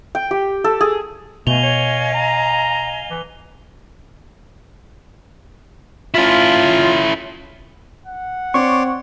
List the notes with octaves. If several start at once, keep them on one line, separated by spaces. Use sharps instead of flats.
G5
G4
A4
G#4
B2 A3 D#5 F5 G#5 F7 G7
C#5
A#5
E3
C#4 E4 F4
F#5
C4 C#5 D5 C6 C#6